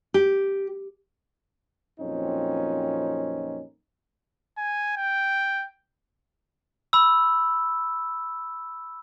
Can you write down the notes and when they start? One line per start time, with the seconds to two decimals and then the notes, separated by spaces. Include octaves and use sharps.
0.14 G4
2.00 F2 A#2 F#3 C4 C#4 D#4
4.58 G#5
4.97 G5
6.93 B5 E6